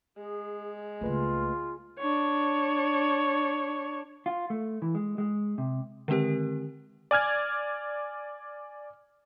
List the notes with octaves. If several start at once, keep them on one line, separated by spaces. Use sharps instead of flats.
G#3 G#4
C#2 A3 A#3 F4 B4 D#5
D4 C#5
F4
A3
E3
G#3
G#3
C3
D3 D#3 G#3 C4 G4 A#4
D5 G#5 F6 G#6